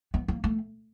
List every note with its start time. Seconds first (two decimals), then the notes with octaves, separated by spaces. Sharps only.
0.14 B3
0.28 A#3
0.44 A3